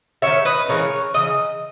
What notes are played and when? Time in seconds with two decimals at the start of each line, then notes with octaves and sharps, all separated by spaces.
0.22 D#3 G#3 C#4 C#5 E5
0.45 B4 D#5
0.68 C#3 E3 G#3 A#4 C#5
1.14 C#3 E3 D#5